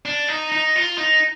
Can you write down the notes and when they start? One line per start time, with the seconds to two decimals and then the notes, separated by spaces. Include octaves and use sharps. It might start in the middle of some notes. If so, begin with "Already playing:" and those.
0.05 D4
0.28 D#4
0.52 D#4
0.76 F4
0.98 D#4